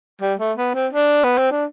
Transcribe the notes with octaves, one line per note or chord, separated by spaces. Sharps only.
G3
A3
B3
C4
D4
B3
C4
D4